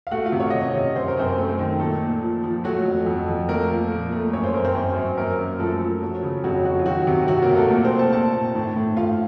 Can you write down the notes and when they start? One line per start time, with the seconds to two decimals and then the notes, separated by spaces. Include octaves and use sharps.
0.07 F5
0.11 A3 F#4 F#5
0.26 F4 F5
0.32 C3
0.40 C#5
0.50 C3 D#5
0.62 C#4 C#5
0.75 C3
0.96 F#2 C5
1.08 A#4
1.17 F#2 C4 C5
1.38 A3
1.59 D#3
1.80 A#2 A3 A4
2.02 A#2
2.22 F3
2.44 F3
2.64 F#3 A3 F#4
2.85 F2
3.06 F2
3.28 F2
3.49 A3 A#3 A#4
3.70 F3
3.92 A#2
4.12 A3
4.33 F#2 C#5
4.43 C5
4.54 F#2 A#4
4.65 C4 C5
4.75 F#2
4.96 F#2
5.17 F#2 A#3 A#4
5.39 F#2
5.59 F3 A3 A4
5.81 F3
6.02 F#3
6.23 C#3
6.44 F2 F#3 F#4
6.65 F#3 F#4
6.79 F4
6.86 D#3 F#3 F#4
7.07 C3
7.28 C3 F#3 F#4
7.42 A#3 A#4
7.50 C3
7.56 A3 A4
7.70 A#2 A#3 A#4
7.84 C4 C5
7.92 A3
7.99 A4 A5
8.12 A#2 A4 A5
8.34 A#2
8.55 A2
8.76 A2
8.97 A2 F4 F5